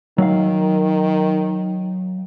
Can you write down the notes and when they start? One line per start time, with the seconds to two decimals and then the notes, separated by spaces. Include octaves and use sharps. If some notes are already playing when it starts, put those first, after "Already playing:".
0.18 D#3 F#3 F5